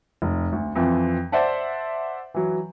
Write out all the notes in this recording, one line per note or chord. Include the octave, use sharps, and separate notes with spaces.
F1
D2
F2 E3 F3
C5 D5 E5 F#5 A5
E3 F#3